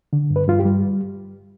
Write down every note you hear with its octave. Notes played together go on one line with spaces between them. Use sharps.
D3
G2
B4
G2 F4
G4
G3